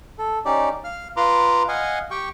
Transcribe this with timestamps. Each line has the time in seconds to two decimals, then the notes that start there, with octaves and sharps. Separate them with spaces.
0.18 A4
0.45 C#4 D#4 G4 D5
0.84 F5 F6
1.17 F4 B4 A#5 C6 D6
1.68 D#5 F5 F#5 G#5
2.11 G4 G5 C#6